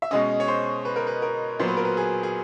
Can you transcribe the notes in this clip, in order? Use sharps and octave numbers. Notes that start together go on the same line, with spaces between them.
E5
B2 G#3 C#4 D#5
C#5
C5
B4
A#4
B4
A#4
A#2 F#3 B3 C5
B4
A#4
B4
G#4
G#4